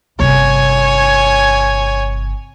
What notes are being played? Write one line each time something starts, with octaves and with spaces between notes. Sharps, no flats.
G1 C3 C#5 G#5